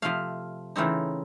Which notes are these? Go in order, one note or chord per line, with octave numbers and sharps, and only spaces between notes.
C3 F3 A3 F5
C#3 E3 A3 C4 D#4